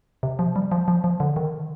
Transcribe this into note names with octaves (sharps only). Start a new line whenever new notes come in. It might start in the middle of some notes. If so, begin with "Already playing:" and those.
C3
F3
G3
F3
F3
F3
D3
D#3